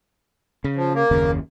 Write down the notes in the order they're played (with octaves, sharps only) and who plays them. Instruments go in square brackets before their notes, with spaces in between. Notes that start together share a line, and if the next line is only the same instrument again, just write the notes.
[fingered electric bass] C#3
[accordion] F3
A#3
[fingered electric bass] F#1 D#2 C#3